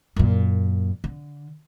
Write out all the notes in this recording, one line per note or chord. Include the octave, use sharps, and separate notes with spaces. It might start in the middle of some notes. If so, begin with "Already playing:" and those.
F#2 A#2
D3